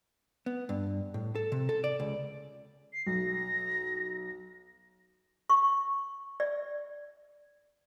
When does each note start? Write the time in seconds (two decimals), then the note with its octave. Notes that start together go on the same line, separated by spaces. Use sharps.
0.46 B3
0.69 G2
1.14 A2
1.35 A4
1.52 C3
1.69 A4
1.84 D5
2.00 C#2
2.93 C7
3.07 B1 A#6
5.50 C#6
6.40 D5